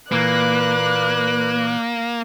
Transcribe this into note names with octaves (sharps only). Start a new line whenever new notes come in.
A#2 E3 A#3 B4 D5 F#6